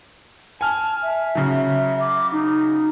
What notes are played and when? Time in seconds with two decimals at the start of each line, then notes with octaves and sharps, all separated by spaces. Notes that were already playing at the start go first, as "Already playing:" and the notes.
0.61 G#5 A5 F6
1.03 E5
1.35 C#3 F#3
2.00 D6
2.32 D#4